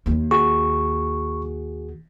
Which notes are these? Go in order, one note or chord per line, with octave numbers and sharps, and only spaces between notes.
D#2 A#3
F#4 G#4 C#6